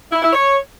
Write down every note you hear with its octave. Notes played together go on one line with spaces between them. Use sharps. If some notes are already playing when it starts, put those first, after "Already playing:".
E4
E4
C#5